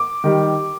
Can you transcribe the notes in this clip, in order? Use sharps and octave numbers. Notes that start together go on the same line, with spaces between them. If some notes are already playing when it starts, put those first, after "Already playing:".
Already playing: D6
D#3 G3